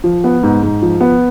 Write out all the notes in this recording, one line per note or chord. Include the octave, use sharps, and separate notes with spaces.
F3
B3
G#2
G#2
F3
B3